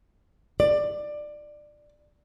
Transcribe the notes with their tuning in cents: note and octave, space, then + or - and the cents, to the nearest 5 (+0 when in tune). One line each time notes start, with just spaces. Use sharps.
D5 +15